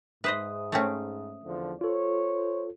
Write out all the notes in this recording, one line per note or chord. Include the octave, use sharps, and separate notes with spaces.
G#2 B4 C5 D#5 E5 D#6
A3 C4 C#4
E2 D3 F3
F4 A4 C5 C#5